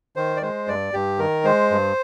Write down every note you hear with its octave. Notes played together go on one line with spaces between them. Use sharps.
D#3 C5
D5
G#3 C5
G2 D5
G2 G4
D#3 A#4
G#3 C5
G2